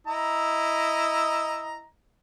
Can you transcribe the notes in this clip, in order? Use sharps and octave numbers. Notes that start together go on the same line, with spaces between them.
E4 D#5 A#5